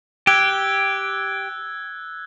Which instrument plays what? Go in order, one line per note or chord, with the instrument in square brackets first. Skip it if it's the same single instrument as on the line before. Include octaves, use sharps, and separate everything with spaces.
[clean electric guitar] G4 [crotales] E6 F#6 G#6